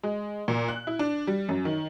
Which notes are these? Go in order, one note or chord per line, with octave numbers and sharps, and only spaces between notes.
G#3
A#2
F#6
E4
D4
G3
F#2
D#3